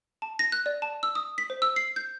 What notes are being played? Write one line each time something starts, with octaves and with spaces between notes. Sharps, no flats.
A5
A#6
F#6
D5
A5
E6
D#6
B6
C5
E6
C7
G6